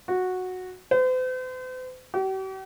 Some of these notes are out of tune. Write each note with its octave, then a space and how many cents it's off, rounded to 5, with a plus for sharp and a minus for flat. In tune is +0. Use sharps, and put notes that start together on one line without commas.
F#4 -10
C5 -45
G4 -45